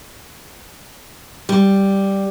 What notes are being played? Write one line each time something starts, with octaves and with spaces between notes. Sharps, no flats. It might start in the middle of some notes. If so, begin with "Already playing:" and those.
G3